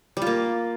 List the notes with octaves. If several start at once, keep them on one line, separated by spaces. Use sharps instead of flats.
G3
F4
A#3